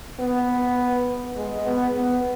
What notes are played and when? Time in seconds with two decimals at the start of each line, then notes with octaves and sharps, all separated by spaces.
0.20 B3
1.37 G#3
1.66 B3
1.95 B3